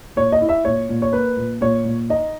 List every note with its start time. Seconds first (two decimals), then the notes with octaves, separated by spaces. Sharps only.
0.16 A#2 C#5
0.32 D#5
0.41 E4
0.49 E5
0.65 A#2 C#5
0.89 A#2
1.02 C#5
1.13 A#3 B4
1.37 A#2
1.61 A#2 C#5
1.85 A#2
2.09 D#4 D#5